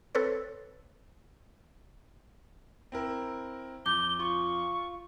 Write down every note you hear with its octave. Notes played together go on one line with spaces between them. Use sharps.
C4 A4 B4 C#5
C4 E4 A#4
F2 D6 G6 G7
F4 C#6